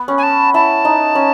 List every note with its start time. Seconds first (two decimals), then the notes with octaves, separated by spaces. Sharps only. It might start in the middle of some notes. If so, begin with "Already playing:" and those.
Already playing: B3
0.08 C#4
0.18 G#5
0.23 A5
0.54 E4 A5
0.85 D#4
1.15 C#4